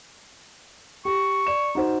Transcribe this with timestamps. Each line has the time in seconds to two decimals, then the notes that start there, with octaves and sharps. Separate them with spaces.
1.05 G4 C#6
1.47 D5 E7
1.75 D#4 F#4 C5